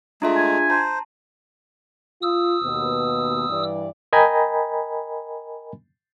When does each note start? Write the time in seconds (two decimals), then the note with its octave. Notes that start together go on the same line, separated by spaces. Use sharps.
0.22 G#3 A3 D4 F4 G#4 E5 A#5
0.37 G#5
0.70 C5 A5 A#5 C6
2.22 F4 D#6 E6
2.64 D#2 B2 B3
3.49 G2 E3 D5
4.13 A#4 D#5 G5 G#5 A#5 B5